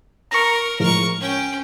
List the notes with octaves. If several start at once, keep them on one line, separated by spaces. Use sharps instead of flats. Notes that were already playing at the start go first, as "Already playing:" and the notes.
A#4 A#5 C#6
A2 F3 G#3 A#4 C#6
C#4 G5